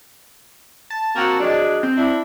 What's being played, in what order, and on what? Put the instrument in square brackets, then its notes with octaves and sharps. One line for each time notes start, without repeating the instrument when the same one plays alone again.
[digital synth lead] A5
[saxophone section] A#3 C4 F#4
F#3 G#3 D4
[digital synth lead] C4
[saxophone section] D4 E4